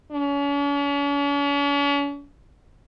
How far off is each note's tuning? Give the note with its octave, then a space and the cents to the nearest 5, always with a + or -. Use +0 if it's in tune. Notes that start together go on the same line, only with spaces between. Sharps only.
C#4 +45